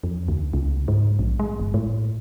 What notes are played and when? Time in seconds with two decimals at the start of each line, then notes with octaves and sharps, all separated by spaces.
0.04 F2
0.28 D2
0.53 C#2
0.88 G#2
1.19 A#1
1.40 G#3
1.60 G1
1.74 A2